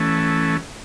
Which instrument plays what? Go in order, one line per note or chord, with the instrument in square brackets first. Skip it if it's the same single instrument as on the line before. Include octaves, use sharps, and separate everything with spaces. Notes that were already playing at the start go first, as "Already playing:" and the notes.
Already playing: [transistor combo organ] E3 A3 C#4